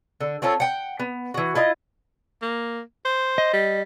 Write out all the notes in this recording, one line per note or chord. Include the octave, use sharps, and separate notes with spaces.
D3
C4 C#4 F4 A4
F#5 G5
B3
E3 F#4
E4 F4 D#5
A#3
C5
D#5
G3